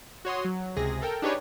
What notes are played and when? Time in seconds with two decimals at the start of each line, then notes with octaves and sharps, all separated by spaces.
0.25 F#4 C#5 C6 D#6
0.45 F#3
0.76 C#2 C3 G#4 A#6
1.02 A4 A#4 G5
1.22 D4 D#4 G4 G#4 B4 C#5